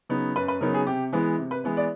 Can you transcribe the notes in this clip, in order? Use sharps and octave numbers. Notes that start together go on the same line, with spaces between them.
C#3 F#3 B3 D#4
F#2 B4
B4
C#3 F#3 B3 D#4 A#4
G#4
C3 G4
E3 G#3 B3 E4
C3
B4
E3 G#3 B3 E4
D5